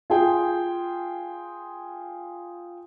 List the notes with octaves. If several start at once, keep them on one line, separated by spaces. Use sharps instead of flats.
F4 G#4 G5